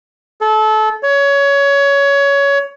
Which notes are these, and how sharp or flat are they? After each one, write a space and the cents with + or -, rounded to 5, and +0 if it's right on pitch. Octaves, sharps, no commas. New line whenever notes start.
A4 -25
C#5 +20